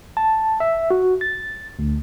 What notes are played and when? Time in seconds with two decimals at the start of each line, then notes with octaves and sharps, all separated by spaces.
0.17 A5
0.60 E5
0.91 F#4
1.21 A6
1.79 D2